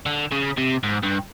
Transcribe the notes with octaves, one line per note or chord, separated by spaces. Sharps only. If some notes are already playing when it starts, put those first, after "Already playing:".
D3
C#3
C3
G#2
G2